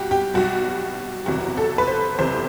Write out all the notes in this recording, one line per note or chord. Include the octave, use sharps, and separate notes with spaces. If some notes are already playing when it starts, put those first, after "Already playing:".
Already playing: B1 G3 F#4 G4
G4
B1 B2 G3 F#4
F#1 E2 C3 F#4
A4
B4
C5
F#1 E2 C3 C5